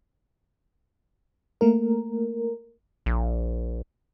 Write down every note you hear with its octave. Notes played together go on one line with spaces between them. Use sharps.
A3 A#3 A#4
A#1